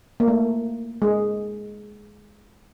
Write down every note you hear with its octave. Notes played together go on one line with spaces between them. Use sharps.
A#3
A3
G#3